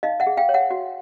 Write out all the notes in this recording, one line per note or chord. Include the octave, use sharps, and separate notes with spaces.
D#4 D#5 F5
E5 F#5
G#4
F5 G5
C#5
E5 F#5
F#4